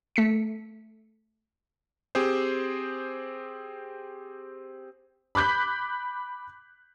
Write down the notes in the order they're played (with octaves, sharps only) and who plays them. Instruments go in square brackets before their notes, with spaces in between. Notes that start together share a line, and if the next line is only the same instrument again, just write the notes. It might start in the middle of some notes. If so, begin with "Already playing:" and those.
[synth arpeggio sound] A3 B6 C#7
[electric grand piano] C4 G4 G#4 C5
[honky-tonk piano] B5 D6 F#6 G6 B6